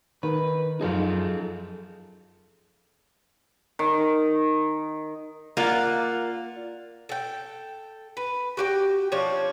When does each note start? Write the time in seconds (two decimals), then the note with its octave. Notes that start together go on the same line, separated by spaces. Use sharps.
0.23 D#3 B4
0.81 F#2 F3 D#4 G#4 A4 F5
3.79 D#3
5.57 A#3 F4 D5 F#5
7.09 A4 G5
8.17 B4
8.57 F#4 G4 G5
9.12 F3 C#4 D4 C#5